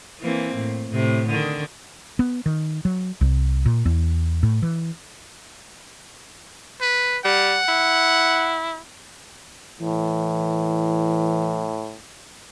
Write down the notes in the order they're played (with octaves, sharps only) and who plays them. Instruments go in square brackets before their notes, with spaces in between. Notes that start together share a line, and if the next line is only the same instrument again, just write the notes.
[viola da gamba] E3 A#3 C4
A2
A2 C3
D3 D#3 D4
[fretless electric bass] B3
D#3
F#3
C2
A#2
E2
A2
E3
[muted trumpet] B4
[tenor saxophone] G3 [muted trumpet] F#5
[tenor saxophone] E4
[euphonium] A2 [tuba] E3